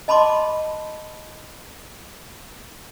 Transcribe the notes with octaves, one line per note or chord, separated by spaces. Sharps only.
D#5 A5 B5 C6 D6